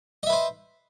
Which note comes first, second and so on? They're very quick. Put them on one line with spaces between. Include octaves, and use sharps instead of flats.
D#5 E5 B4 C5